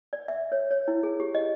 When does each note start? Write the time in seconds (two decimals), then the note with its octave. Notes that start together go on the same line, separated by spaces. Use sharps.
0.13 D5
0.28 E5
0.52 C#5
0.71 C#5
0.88 E4
1.03 G#4
1.20 G4
1.35 D#5